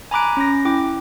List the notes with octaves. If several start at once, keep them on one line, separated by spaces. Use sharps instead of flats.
G#5 A#5 B5 D6 F#6 D7
C#4 A#6
E4 G5 D6